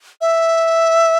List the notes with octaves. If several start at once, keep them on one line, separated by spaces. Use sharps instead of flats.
E5